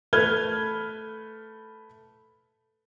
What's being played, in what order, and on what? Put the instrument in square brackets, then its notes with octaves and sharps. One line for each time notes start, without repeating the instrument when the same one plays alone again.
[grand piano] A3 B4 F6 G#6 G7